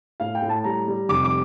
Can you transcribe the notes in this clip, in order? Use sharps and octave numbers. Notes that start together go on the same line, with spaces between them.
A2 F5
G5
A2
A5
G3 A#5
G3
F1 D6
D6